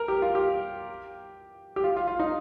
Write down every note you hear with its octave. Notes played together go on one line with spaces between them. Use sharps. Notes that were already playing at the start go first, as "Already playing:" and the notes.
Already playing: A#4
G4
F4
G4
G4
F4
F4
F4
D#4